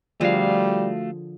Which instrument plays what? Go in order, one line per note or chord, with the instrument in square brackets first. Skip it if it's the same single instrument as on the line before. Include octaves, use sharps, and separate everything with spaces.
[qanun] D3 F3 G#4 [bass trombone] G3 [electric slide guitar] A3 F#4 F5